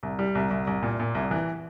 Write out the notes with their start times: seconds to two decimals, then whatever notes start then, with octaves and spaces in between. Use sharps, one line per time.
0.03 C2
0.19 G3
0.35 C2
0.51 C2
0.67 C2
0.83 A#2
0.99 A#2
1.15 C2
1.31 E3